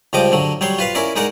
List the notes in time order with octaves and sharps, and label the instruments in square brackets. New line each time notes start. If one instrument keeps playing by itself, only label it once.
[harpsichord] C#2 F3 G3 D#5 D6
D3 F#3
F#3 G3 C#5 C6
F4 B4 F5
C#4 E4 A#4 D5
G#3 D#4 A#4 D5 F#5